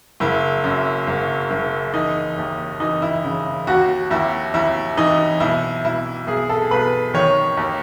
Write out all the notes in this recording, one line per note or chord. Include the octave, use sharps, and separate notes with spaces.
F#1 E4
F#2
F#1
F#1
E3 D#4
D#2
E3 D#4
E4
C#3
D#2 F#4
D#2 E4
D#2 E4
E3 D#4
B1 E4
B1 E4
B1 G#4
A4
B1 B4
D#3 C#5
D#2